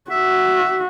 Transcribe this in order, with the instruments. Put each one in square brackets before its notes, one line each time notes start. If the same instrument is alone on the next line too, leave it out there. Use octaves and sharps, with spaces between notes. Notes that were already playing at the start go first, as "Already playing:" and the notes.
[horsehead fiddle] F#4 [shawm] E5